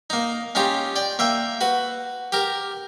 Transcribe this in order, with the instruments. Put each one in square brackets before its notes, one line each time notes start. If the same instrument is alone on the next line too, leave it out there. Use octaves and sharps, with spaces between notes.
[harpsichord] A#3 D#4
C#4 D#4 F4 G4
D5 G5
A#3 E5 G5
F#4 B4
G4 A#4